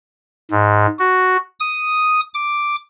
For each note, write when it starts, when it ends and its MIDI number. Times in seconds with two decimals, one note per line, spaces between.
0.51 0.87 44
0.99 1.37 66
1.60 2.20 87
2.34 2.75 86